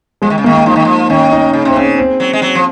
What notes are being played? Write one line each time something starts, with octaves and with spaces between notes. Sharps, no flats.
F3 G#3
D#3
C#3
D#3 A#3
F3 D#4
D#3
F3
D#3 C#4
D#4
C#3
C3 C4
C#3 C#4
C4
F#3
G#3
F#3
F3